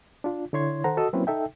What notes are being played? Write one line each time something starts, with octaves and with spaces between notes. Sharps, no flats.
D4 F4
D3 E4 C#5 C6 G#6
D#3 A4 C5 F#5 A#5
F#4 A4 D#5 D#6 E6
F#3 A#3 C4 C#4 E4 B4
D#4 A4 E5 G5